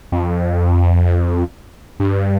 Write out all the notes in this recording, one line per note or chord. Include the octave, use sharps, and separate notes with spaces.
F2
G2